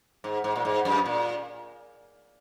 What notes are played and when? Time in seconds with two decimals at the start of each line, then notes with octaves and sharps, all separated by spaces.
0.24 G#2
0.44 G#2
0.56 A#2
0.65 G#2
0.85 F#2
1.06 A#2